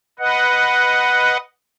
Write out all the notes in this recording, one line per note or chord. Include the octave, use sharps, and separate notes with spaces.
B4 D#5 F#5